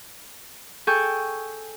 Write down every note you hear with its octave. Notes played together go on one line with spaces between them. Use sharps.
G#4 A4 G5 G#5 C#6 G6